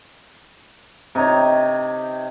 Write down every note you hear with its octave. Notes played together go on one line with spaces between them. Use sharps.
C3 D#4 C#5